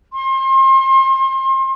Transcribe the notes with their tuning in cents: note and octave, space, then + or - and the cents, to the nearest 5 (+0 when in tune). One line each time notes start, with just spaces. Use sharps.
C6 +35